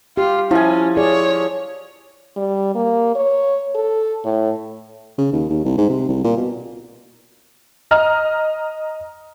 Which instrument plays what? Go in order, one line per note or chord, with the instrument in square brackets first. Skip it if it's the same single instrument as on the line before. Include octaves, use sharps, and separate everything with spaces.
[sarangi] F4 [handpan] G4
[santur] F3 G#5 [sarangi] C#4 [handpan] E4
[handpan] G#4 D5 [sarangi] C#5
[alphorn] G3
A#3
C#5
A4
A2
[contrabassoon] C#3
D#2
D#2
C2
G#2
C3
C2
A#2
B2
[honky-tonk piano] D#5 A#5 F6